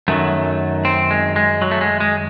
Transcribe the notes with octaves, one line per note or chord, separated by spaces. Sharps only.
F#2 D#3 F#3 A3
C4
G#3
G#3
F#3
A3
G#3
G#3